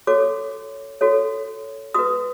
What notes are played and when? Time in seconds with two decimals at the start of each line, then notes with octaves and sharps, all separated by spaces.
0.07 F#4 A4 C#5 D6
1.01 F#4 A4 C#5
1.94 F#4 B4 D#6